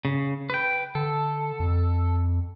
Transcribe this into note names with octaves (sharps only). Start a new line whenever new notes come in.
C#3
B4 G5
D3 A4
F2